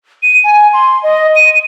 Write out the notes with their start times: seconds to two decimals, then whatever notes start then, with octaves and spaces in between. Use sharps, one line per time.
0.22 D#7
0.44 G#5
0.73 C6
1.03 D#5
1.36 D#7